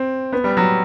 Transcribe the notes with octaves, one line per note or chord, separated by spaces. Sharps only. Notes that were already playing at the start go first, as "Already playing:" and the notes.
Already playing: C4
B3
G3
F#3